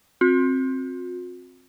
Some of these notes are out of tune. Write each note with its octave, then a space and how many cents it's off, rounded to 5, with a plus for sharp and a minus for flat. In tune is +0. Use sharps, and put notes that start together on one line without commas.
C4 +15 F#4 -45